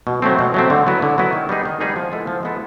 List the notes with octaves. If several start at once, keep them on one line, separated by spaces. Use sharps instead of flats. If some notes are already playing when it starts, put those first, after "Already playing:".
B2
F#3 A3 C4
B2
F#3 A3 C4
D3
F#3 B3 E4
D3
F#3 B3 E4
D#3
G3 B3 D#4 G#4
D#3
G3 B3 D#4 G#4
F3
G#3 B3 E4 A4
F3
G#3 B3 E4 A4